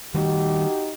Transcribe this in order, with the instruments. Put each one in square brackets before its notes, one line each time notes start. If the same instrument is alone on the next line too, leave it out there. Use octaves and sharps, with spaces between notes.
[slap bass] D#3 G3 A3 [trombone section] D#4 F#4 G4